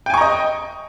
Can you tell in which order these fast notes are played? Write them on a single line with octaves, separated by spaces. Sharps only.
G5 G#5 C#6 A#5 D#5